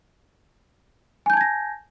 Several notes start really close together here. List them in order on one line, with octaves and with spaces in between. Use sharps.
G#5 G6 A5 G#6 A#6